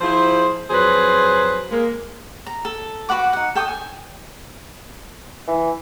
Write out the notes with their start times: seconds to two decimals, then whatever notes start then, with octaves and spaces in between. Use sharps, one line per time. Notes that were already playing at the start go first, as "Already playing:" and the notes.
0.01 F3 E4 F4 G#4 C5
0.69 F2 F#3 G#4 B4 C5
1.71 G#3 A#3
2.47 A#5
2.65 A4
3.09 F#4 B4 F#5 D6
3.33 D#4 F#5
3.55 A4 G5 D6 D#6
3.68 G#5
5.48 E3